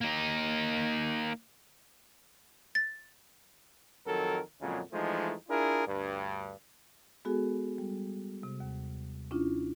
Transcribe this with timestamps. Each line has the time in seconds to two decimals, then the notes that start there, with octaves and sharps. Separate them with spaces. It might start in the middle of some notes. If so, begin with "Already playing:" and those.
0.01 A#3 D#4
2.75 A6
4.06 F2 D#3 F#3 A4 A#4
4.61 F2 A#2 C#3 F#3 G#3
4.93 E3 F3 G#3 A3 D#4
5.49 D4 E4 F4 G#4 A#4
5.87 D2 G2
7.25 G#3 B3 F#4 G#4 A4
7.78 G3
8.43 C3
8.60 D#2
9.31 C#4 D4 E4 F4